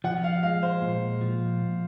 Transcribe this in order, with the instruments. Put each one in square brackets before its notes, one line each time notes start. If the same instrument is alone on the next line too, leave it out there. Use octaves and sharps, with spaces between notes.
[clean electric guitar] F3 [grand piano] F#5
[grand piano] F5
[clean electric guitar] G#3 [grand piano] F5
[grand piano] C5
[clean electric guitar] A#2
F3